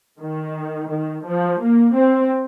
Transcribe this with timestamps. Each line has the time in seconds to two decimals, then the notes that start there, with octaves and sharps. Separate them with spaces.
0.21 D#3
0.90 D#3
1.26 F3
1.61 A#3
1.96 C4